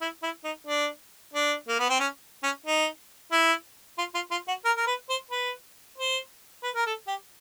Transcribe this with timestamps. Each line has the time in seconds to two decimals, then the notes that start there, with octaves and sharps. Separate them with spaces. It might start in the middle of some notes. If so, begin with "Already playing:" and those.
0.01 E4
0.23 E4
0.44 D#4
0.67 D4
1.34 D4
1.68 A#3
1.80 B3
1.89 C4
2.00 C#4
2.43 C#4
2.66 D#4
3.32 E4
3.98 F4
4.15 F4
4.31 F4
4.48 F#4
4.65 A#4
4.77 A#4
4.87 B4
5.09 C5
5.31 B4
5.98 C5
6.63 B4
6.75 A#4
6.86 A4
7.08 G4